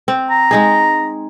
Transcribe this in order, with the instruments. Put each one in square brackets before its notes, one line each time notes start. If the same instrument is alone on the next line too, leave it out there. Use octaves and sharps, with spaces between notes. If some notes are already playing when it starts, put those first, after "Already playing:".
[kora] C4
[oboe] A#5
[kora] G#3 D#4 G#4